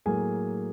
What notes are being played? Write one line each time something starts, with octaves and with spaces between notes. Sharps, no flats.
A2 F#3 A#3 G#4 G#5